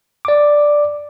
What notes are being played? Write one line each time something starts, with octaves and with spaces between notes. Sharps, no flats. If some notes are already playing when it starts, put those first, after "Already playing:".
D5 D6